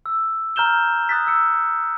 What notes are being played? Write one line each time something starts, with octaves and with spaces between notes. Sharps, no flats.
E6
A#5 F6 G6 E7 G7
D#6 F#6 A6 B6
E6 F6 C#7